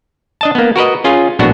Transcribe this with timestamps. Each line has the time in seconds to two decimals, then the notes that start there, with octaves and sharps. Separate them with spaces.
0.41 D4 D#5 A5
0.55 A#3 B3
0.76 F#4 A#4 B4 D#5
1.04 C#4 F4 G#4
1.39 A#1 A2 B3 D4 F#4